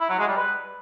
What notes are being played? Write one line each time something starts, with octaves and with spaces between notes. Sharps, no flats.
E4
F#3
G#3
G3
B4